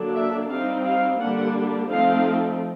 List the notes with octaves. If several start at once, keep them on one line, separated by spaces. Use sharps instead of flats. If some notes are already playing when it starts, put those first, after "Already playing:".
Already playing: D3 F#3 A#3 D4
E5
G3 C4 D#4 F5
F5
D3 G3 A#3 D4 F#5
F3 A3 C4 D#4 F5